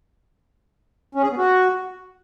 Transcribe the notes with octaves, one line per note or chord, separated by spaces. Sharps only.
C#4
G#4
B3
F#4